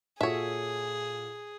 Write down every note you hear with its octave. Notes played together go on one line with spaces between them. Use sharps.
A#2 F#4 G#4 A4 C#5 E5